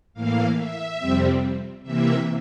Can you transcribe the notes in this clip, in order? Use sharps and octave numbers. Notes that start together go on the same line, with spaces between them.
A2 E3 A#3 F5
E5
F2 C3 G3 C4
C3 E3 A#3 E5